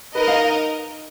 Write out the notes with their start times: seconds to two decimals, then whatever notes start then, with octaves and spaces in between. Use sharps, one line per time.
0.15 D#4 A#4 B4 D#5
0.28 F5